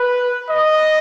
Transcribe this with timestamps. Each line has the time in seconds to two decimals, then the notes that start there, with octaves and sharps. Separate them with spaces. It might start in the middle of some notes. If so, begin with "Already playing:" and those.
Already playing: B4
0.50 D#5